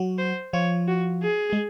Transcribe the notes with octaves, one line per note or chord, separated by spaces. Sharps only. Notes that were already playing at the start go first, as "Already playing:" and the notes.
Already playing: F#3 F#4
C5
F3 F4 C#5
F#4
G#4
G#3